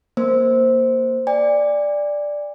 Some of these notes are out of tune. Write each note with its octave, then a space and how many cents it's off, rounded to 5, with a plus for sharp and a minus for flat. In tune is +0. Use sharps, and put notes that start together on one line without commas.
A#3 +0 C5 +0
D5 +0 G#5 -45